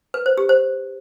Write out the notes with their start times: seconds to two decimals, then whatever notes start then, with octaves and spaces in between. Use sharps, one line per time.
0.14 B4
0.26 C5
0.38 G4
0.49 C5